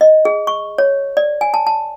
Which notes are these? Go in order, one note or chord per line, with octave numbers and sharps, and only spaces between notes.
D#5
G#4
C#6
C#5
D5
G#5
A5
A5